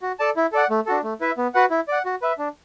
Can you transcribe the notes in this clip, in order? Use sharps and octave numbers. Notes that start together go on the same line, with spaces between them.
F#4
A4 D5 A5
E4
A4 D5 F#5
A3
D4 F#4 A4
A3
E4 B4 E5
B3
F#4 B4 F#5
E4
D5 F#5
F#4
B4 E5
D4